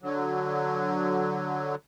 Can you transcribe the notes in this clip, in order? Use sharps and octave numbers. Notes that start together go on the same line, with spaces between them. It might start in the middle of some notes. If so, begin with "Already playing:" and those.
D3 F#3